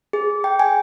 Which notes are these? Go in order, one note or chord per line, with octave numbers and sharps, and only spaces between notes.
G#4
G5
G#5